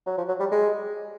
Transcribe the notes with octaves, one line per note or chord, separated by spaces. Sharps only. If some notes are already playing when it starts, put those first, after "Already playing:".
F#3
F3
F#3
G3
G#3